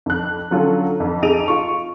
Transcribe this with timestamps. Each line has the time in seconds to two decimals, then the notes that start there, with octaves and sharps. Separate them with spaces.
0.06 F2 F#6
0.51 D3 F#3 C#4 F4 A4
1.00 F2
1.22 F2 D#4 G#4 D7 D#7 F7
1.48 F4 C#6